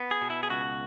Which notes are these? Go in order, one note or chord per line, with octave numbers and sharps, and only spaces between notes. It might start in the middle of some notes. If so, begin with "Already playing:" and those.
Already playing: B3
G#4
B2
E4
G#4
C#2 F#4